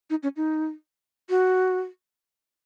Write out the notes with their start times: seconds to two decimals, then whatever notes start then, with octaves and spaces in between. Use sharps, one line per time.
0.10 D#4
0.23 C#4
0.36 D#4
1.30 F#4